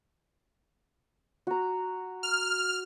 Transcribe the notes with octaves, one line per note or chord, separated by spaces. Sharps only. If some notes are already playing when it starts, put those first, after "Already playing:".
F#4 A#5
F6